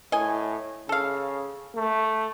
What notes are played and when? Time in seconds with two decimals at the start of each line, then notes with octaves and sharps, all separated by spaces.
0.12 A2 D#5 G#5
0.89 C#3 A4 F5
1.75 A3